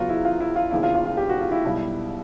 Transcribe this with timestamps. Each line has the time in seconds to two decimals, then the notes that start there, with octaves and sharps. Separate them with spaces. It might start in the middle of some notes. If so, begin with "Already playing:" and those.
Already playing: E2 C#3 F#3 B3 F4 F#4
0.09 E4
0.25 F4
0.40 E4
0.56 F4
0.71 E1 D#2 C#3 E4
0.83 F4
0.95 F4
1.06 F4
1.17 G4
1.29 F#4
1.41 F4
1.52 E4
1.64 B1 B2 G3